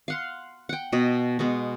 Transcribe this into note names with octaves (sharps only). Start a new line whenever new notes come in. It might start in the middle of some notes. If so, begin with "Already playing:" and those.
F5 F#5 C6
F#5 G5
B2 D#5 B5
B2 G#3 B3